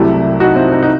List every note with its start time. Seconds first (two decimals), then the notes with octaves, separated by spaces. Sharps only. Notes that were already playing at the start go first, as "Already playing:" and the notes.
Already playing: C2 C3 F#3 A3 E4 G4
0.40 D#4 F#4
0.56 C4 E4
0.72 D#4
0.83 D#4